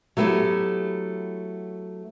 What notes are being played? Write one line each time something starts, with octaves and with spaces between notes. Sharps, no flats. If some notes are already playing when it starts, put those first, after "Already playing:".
F#3 A3 B3 E4 G4